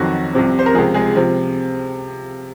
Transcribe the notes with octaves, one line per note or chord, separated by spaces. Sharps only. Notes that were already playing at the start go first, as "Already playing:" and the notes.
Already playing: F2 D#3 F#3 F#4
C2 C3 F3
C5
A#4
C#2 C3 F3 G#3 G#4
G#3 G#4
C3 F3